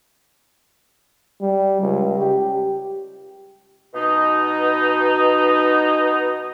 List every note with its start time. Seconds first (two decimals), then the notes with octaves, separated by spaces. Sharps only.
1.41 G3
1.81 C#2
2.18 G4
3.94 B2 D#4